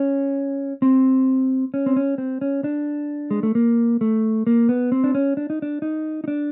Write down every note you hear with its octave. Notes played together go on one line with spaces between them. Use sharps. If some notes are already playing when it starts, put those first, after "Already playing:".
Already playing: C#4
C4
C#4
C4
C#4
C4
C#4
D4
G#3
A3
A#3
A3
A#3
B3
C4
D4
C#4
D4
D#4
D4
D#4
D#4
D4